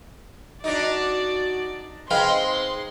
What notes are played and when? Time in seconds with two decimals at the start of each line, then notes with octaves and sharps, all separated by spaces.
0.64 D4 D#4 F#4 D5
2.11 G#3 C4 D#4 B4 F5 G5 C6